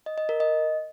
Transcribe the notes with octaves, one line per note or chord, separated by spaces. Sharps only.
D#5
D#5
A#4
D#5